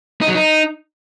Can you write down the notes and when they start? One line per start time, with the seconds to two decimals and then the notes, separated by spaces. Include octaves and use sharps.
0.21 D#4
0.28 F#3
0.35 D#4